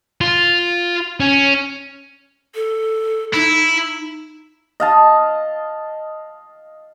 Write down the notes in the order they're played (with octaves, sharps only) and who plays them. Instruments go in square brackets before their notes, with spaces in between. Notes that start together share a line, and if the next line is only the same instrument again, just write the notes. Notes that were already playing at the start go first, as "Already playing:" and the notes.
[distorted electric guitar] F4
C#4
[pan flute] A4
[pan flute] D#4 [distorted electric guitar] E4
[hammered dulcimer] D#5 F5 A5